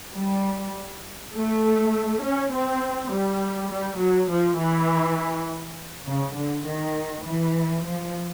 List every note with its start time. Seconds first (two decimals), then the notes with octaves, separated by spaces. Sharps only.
0.16 G3
1.35 A3
2.24 C#4
2.52 C4
3.11 G3
3.71 G3
4.00 F#3
4.30 F3
4.58 E3
6.06 C#3
6.37 D3
6.65 D#3
7.24 E3
7.84 F3